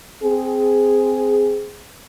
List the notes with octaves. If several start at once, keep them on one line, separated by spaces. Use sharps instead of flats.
C4 G#4